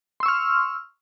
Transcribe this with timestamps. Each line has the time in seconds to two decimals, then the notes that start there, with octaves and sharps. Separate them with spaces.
0.20 C6
0.23 E6
0.26 C#6
0.28 F6